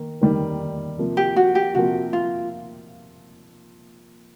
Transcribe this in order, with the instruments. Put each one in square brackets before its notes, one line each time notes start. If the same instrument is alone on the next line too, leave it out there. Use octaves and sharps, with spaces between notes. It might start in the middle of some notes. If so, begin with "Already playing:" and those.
Already playing: [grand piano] D#3 A#3
D#3 G3 A#3
C3 F3 A#3
[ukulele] G4
F#4
G4
[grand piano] C3 F3 A#3 [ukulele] F#4
[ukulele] F4